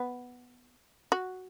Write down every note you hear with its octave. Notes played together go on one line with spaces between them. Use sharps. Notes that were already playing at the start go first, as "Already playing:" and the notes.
Already playing: B3
F#4